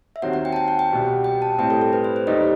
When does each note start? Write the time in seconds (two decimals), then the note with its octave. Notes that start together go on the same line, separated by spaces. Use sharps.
0.16 E5
0.22 D#2 D#3 F#3 C4 F#5
0.33 F#5
0.45 G5
0.53 A5
0.56 G5
0.68 F#5
0.79 G5
0.91 C2 B2 G3
1.24 G5
1.42 A5
1.58 A2 G3 C4 G5
1.70 A4
1.81 A4
1.93 B4
2.04 C5
2.16 C5
2.27 D#2 D#3 G3 D#4 D#5